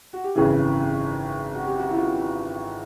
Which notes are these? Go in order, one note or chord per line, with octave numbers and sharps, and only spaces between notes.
F#4
G4
G#1 F#2 C#3 E3 G#4
F#4
G4
F#4
E4
F4